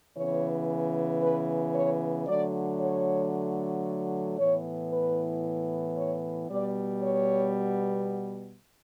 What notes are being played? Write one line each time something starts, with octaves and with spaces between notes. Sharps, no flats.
C#3 E3 B3 C#5
B4
C#5
D3 F#3 A3 D5
C#5
A2 E3 B3 C#5
B4
C#5
B2 G3 B3 D5
C#5